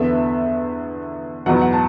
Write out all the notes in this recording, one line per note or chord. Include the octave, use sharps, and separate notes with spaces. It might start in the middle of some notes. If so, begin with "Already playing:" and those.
Already playing: E2 D3 B3 E5
E2 B2 F#3 F#5
F#5
A5